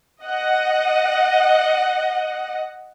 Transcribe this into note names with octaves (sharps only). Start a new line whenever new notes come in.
D#5 F#5